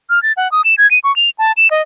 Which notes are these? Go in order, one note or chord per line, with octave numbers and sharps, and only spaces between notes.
F6
A6
F#5
D#6
E7
G#6
D#7
C#6
F7
A5
E7
D#5